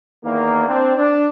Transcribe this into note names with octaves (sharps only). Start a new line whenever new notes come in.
E2 D#3 A#3
C4 D4
D4